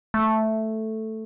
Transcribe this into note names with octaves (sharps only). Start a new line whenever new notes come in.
A3